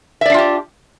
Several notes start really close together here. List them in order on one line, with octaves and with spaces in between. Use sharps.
E5 D5 D4 F4 G4